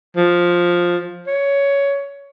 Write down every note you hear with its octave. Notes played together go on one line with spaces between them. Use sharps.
F3
C#5